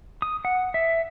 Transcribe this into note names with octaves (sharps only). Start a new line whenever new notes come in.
D#6
F#5
E5